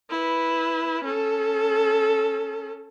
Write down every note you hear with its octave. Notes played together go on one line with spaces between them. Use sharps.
E4 B4
C#4 A4